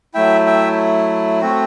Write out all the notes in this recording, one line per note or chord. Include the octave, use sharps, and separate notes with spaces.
F#3 A3 E4 E5 G5
E5 G5
A3 C4 F#4